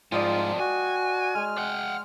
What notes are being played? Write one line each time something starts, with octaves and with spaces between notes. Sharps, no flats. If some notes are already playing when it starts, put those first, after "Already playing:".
C2 G#2 F3 F4 D5 D#5 G5
F#4 G#5
G#3 F6
F#5 G5